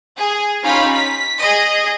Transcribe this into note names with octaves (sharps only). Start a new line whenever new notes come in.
G#4
C#4 D#4 F4 G4 F5 B5
B6
G#4 D#5